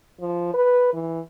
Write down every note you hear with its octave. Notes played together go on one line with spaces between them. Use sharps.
F3
B4
E3